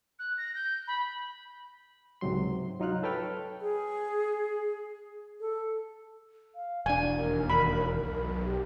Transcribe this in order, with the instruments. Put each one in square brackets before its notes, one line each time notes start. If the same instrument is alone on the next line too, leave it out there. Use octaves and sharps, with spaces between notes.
[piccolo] F#6
A#6
G6
B5
[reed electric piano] C#2 G#2 C3 F#3 C6
F#3 D#4 F4 F6 F#6
A4 B4 C#5 G5 F6
[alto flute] G#4
A4
F5
[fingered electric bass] E1 D4 [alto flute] D5 [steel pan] G#5
[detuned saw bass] D#2 [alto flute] A#4
[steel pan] B5
[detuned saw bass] B1
[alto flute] G4